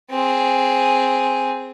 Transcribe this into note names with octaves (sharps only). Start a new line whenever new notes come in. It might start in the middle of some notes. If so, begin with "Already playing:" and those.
C4 G#4